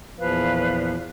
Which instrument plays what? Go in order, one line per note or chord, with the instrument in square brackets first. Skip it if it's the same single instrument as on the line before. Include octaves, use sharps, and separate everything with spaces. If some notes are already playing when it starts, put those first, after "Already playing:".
[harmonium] E2 A#2 F3 [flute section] B4 F5